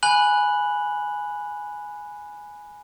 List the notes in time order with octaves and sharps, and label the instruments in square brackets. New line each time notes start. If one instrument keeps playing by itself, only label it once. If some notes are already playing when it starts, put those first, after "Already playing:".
[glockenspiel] G#5 B5 F#6 F#7